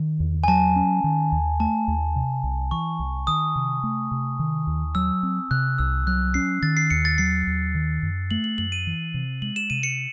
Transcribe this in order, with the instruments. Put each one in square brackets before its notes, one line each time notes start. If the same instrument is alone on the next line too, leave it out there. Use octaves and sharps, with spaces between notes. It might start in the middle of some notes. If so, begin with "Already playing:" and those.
Already playing: [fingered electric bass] D#3
E2
[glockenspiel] G#5
[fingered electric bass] F#3 [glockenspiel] A5
[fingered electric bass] C#4
D#3
D#2
[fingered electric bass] A3 [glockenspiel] A5
[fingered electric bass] D#2
C3
C2
[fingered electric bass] E3 [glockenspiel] C#6
[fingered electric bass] C2
[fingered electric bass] D#3 [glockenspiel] D#6
[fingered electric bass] C3
A3
C3
D#3
D#2
[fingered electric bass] F#3 [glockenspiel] E6
[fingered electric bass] C4
[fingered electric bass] C3 [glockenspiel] F#6
[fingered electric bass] C2 [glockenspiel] E6
[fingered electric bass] F#3 [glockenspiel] F#6
[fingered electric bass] C#4 [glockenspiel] C7
[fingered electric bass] D#3 [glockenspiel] A6
[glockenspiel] C7
[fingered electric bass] D#2 [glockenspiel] C#7
[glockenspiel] A6
[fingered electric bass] F#3 [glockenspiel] C7
[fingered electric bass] D#2
D#3
F#2
[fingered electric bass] A3 [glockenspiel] F#7
[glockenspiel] F#7
[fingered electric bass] F#2 [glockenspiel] F#7
[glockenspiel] D#7
[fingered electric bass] E3
C3
[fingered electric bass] G#3 [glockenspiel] F#7
[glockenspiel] E7
[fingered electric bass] C3 [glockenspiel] D#7
[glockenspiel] C#7